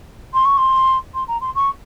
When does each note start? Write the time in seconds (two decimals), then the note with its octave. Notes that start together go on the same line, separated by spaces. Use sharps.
0.33 C6
0.45 C#6
0.57 C6
1.14 C6
1.28 A#5
1.41 C6
1.55 C#6